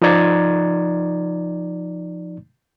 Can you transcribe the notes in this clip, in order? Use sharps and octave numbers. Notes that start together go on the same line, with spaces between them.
F3 D#4 D5 A#5 G#6 A6